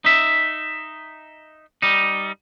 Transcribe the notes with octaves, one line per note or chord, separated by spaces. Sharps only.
D#4 E5
G3 D#4